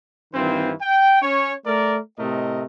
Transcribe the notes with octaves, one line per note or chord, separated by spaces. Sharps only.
G2 D#3 E3 C4 F4 C5
G5
C#4 C#5
A3 A#4 D5
A2 C3 A3 A#4 D#5